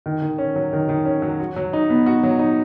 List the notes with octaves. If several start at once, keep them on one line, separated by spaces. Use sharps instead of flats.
D#3
D#3
C#4
F#3
D#3
D#3
C#4
F#3
F#4
F#3
D#4
B3
F#4
F#3
D#4